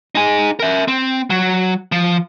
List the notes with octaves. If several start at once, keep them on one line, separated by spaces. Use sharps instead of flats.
D#4 G#4
A#4 E5
C4
F#3
F3